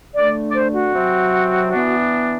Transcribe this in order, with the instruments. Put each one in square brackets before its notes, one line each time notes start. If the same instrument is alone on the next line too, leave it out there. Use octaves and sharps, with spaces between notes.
[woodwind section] D3 A3 D4 D5
D5
C5
F#4
C3 F#3 C4
E3 B3 D4